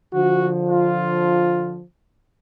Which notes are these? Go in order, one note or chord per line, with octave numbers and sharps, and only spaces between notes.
D3 F3 F#4
F4